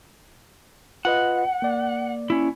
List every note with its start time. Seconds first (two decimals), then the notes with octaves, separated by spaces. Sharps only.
1.05 F4 B4 D#5 F#5
1.62 A#3 D5
2.30 C#4 E4